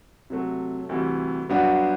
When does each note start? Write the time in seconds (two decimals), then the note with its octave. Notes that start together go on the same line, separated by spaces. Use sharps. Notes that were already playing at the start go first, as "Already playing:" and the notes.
0.30 C3 F#3 A3
0.89 D2 C3 E3 G3
1.49 G2 F#3 B3 D4 F#4